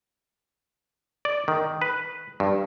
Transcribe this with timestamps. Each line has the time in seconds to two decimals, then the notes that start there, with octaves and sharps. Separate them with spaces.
1.25 D5
1.48 D#3
1.82 B4
2.40 G2